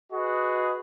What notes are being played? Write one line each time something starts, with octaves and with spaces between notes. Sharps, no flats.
F#4 G#4 B4 D#5